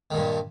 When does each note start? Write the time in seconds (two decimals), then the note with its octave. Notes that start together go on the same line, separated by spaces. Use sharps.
0.10 D#3
0.14 A#2
0.17 G2